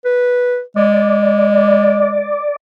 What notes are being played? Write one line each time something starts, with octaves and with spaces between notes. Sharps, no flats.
B4
G#3 D5